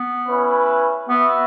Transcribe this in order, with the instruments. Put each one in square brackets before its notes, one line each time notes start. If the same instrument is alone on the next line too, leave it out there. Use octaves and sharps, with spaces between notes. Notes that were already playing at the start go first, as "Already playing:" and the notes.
Already playing: [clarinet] B3
[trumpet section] C#4 E4 B4
[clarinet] B3 [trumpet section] F#4 B4 E5